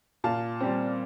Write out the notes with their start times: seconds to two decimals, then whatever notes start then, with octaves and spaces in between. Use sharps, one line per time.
0.24 A#2 F5 A5
0.60 G3 C4